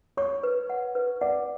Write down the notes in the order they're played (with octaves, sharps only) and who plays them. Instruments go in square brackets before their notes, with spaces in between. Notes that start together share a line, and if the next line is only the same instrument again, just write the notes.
[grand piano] C#5 [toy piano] C#6
[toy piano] B4
F#5
B4
[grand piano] D5 [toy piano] F#5